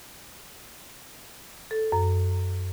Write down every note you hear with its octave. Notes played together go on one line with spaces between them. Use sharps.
A4
F#2